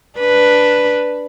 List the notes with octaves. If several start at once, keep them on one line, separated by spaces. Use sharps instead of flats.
D4 B4